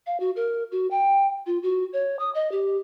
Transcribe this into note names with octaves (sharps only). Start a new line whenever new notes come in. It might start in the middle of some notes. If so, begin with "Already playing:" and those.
F5
F#4
A#4
F#4
G5
F4
F#4
C#5
D#6
D#5
G4